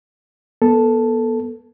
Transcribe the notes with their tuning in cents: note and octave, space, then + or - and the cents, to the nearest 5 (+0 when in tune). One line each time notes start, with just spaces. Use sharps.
B3 -30 A4 +0